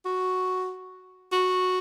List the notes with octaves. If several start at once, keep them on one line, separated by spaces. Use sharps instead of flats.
F#4
F#4